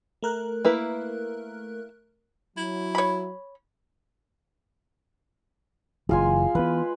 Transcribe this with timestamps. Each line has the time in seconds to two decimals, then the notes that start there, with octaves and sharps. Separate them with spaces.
0.23 A3 A#4 F#6
0.65 A#3 E4 B4
2.57 F#3 E4
2.95 C#5 B5
6.09 F#1 E3 G#3 F4 G#5
6.55 E3 B3 B4